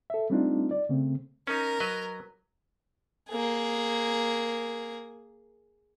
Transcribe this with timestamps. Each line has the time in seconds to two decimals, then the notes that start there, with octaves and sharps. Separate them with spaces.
0.10 A4 E5
0.30 G3 A3 C4 D4 D#4 F4
0.71 D5
0.89 C#3 A3 C4
1.47 C#4 D#4 A#4
1.80 F#3 B4 D#5
3.29 A#3 G#4